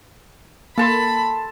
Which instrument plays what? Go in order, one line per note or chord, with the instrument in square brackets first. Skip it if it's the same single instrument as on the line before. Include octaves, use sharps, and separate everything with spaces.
[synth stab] A#3 [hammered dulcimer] A4 A5 C6 [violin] B5